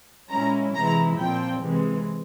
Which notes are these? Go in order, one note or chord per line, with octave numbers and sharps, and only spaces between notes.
A#2 G#3 C#4 E4 A#5
C3 E3 G#3 E4 A#5
A#2 F3 C4 G5
C3 E3 G#3